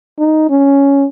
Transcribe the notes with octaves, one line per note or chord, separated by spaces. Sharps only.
D#4
C#4